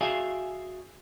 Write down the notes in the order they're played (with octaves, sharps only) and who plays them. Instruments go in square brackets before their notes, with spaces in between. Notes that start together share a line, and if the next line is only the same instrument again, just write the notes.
[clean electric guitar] F#4 G#4 D5 E5 F5 G#5